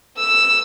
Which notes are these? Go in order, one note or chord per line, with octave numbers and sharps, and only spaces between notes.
E6